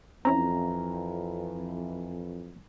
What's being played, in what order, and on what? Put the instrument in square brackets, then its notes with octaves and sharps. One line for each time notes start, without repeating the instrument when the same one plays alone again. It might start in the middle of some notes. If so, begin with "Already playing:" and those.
[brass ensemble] F2 E3 [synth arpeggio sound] C4 C#4 E4 [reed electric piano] A#5